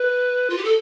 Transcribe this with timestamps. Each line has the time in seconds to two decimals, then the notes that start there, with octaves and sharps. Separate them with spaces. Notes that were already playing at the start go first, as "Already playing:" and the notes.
Already playing: B4
0.50 F4
0.57 G4
0.64 A4